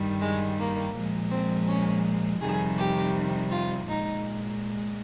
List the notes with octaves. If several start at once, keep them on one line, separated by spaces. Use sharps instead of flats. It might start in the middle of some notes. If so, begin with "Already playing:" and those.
Already playing: G2 D#3 G3
G#3
A#3
A#2 F3 G#3
C4
C#4
F2 C3 D#3 G3 G#4
G4
F4
A#2 G#3 D#4